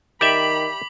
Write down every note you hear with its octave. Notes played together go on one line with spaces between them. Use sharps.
D#3 G4 D5 E5 B5 D6 F#7